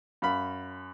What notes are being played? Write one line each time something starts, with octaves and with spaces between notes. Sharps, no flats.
F#2 F5 B5